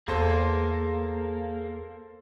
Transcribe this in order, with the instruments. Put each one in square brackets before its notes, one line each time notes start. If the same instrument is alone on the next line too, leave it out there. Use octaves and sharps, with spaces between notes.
[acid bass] E2 [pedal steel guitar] A#3 [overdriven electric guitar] G#4 C6 [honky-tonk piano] A4 C5